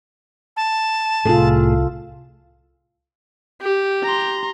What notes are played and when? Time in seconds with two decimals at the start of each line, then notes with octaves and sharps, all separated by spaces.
0.57 A5
1.26 C2 A2 F4 G#4 A4
3.61 G4
4.04 A#5 C6